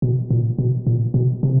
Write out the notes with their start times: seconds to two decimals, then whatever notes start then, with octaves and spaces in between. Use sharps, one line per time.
0.02 B2
0.30 A#2
0.58 B2
0.87 A#2
1.14 B2
1.43 C3